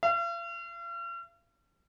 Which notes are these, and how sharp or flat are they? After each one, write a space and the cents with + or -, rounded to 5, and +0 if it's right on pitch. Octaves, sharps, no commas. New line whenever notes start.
F5 -45